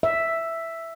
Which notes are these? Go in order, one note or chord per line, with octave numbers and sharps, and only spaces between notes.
E5